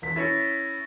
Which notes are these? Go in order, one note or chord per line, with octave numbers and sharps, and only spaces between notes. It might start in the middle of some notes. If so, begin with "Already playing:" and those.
E1 B6
C#4 E4 A6 A#6 C#7